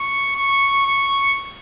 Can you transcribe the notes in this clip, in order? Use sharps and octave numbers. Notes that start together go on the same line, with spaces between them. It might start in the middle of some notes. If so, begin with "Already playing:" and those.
Already playing: C#6
C#6
C#6